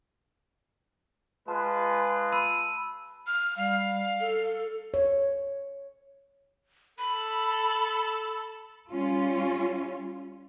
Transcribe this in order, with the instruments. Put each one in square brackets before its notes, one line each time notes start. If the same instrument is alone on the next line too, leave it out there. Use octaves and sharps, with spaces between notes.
[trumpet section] G#3 F4 B4 [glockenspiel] A5
[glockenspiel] B5 E6 D#7
[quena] F6
[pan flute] G3 [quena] F5
[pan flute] A4
[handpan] C#5
[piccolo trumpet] A4 [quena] B5
[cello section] G3 C#4 F4